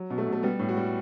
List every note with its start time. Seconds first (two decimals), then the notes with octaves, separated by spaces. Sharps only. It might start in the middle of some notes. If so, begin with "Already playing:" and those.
Already playing: F#3
0.10 B2
0.18 A3
0.27 B2
0.33 A3
0.43 G3 B3
0.59 A2
0.69 F#4
0.77 G3